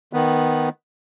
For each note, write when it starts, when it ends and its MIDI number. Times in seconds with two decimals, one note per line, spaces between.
0.13 0.69 51
0.13 0.69 59